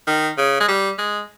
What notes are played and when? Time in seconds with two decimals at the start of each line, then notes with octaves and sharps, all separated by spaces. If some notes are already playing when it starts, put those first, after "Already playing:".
0.07 D#3
0.38 C#3
0.60 G#3
0.68 G3
0.98 G#3